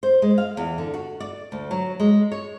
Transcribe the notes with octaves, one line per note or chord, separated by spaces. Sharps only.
C5
G#3
F5
E2
D3
F#4
D5
D2
F#3
G#3
C#5